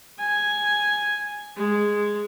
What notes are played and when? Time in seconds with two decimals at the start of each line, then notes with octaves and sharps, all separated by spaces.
0.19 G#5
1.57 G#3